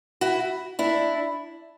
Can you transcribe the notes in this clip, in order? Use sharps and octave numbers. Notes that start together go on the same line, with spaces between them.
E4 F#4
D4 E4